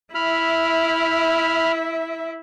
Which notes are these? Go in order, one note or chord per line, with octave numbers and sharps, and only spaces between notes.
E4 E5 B5 F6